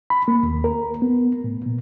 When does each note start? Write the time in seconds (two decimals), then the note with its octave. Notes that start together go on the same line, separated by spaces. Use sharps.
0.10 B5
0.28 A#3
0.43 D#2
0.64 A#4
1.02 B3
1.44 A2
1.66 A#2